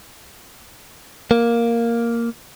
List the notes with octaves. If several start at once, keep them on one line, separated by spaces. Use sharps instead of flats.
A#3